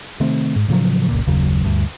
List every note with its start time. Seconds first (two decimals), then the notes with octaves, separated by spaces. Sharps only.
0.20 C3 D#3 A3 C4
0.56 G#2
0.68 A2 C#3 F3 F#3
1.09 F#1 C#2 A#2
1.27 F#1 D#2 C#3 F#3
1.64 D2 G2